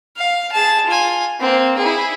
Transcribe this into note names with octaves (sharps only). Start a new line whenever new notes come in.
F5
G#4 A5
F4 G#5
A#3 C4
E4 G#4